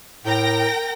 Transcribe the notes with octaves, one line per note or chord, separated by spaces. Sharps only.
A2 A#4 G5 A#6